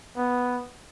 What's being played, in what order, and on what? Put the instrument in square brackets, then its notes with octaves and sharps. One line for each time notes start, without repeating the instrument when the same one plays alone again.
[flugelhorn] B3